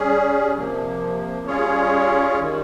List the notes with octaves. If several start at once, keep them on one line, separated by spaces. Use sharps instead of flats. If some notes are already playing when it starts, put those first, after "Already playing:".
Already playing: G3 C#4 G#4
C3 F3 A#3
G3 C#4 F4 G#4 C#5
D#3 G3